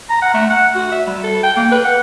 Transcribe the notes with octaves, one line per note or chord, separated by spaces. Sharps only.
A#5
F#5
A3
F#5
F#4
E5
G3
A4
G5
A#3
B4
F#5